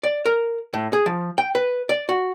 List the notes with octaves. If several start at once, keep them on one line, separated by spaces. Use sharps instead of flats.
D5
A#4
A2
G#4
F3
G5
B4
D5
F#4